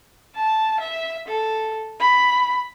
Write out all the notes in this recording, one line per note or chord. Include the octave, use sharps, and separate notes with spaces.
A5
E5
A4
B5